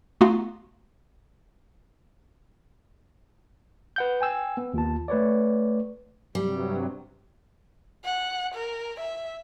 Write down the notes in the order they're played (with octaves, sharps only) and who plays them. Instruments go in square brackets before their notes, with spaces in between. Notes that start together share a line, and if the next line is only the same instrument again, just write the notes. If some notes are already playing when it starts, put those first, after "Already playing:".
[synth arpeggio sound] A3 B3 D#4 F4 F#4 F5
[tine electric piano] B4 F#5 G6
G5 G#5 E6
B3
D#2 F4 A5
A3 B4 C#5 D5
[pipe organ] G2 C3 F#3 [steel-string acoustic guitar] G3
[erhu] F#5
A#4
E5